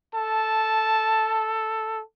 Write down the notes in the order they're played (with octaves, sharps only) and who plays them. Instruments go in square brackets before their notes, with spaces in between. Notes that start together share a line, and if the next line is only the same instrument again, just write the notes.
[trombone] A4 [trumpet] A5